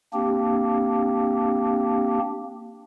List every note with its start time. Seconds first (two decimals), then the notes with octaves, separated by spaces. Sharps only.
0.13 A#3 C4 D4 G4